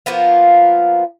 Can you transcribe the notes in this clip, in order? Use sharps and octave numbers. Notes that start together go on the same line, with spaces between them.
F3 A#3 B3 F4